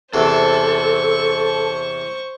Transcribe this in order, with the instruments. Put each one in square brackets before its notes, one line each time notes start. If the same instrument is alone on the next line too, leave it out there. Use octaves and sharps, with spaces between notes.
[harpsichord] E2 C3 [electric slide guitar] A4 [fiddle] C5 C#6